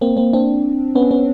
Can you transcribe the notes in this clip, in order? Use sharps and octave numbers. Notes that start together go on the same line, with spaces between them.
A#3 C4
A#3 C4
C4 D4
B3 C#4
B3 C#4